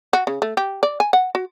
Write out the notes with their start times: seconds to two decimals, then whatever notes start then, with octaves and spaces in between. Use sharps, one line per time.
0.13 F#4
0.27 C#3
0.42 A3
0.57 G4
0.83 D5
1.00 G#5
1.13 F#5
1.35 F#4